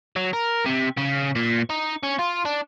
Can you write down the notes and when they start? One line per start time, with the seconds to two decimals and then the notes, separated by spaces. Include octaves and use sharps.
0.16 F#3
0.33 A#4
0.66 C3
0.98 C#3
1.36 A#2
1.70 D#4
2.03 C#4
2.19 F4
2.45 D4